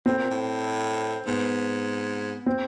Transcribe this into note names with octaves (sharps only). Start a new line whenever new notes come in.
A2 C4
A#2
A2
G#2 B3
C4